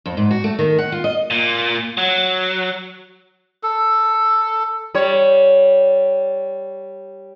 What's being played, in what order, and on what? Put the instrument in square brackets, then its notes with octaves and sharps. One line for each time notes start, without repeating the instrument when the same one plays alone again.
[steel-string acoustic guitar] F2
G#2
F#4
A3
D#3
F#5
F4
D#5
[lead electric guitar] A#2
F#3
[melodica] A4
[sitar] G3 C#5